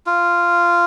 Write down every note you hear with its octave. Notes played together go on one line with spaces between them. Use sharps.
F4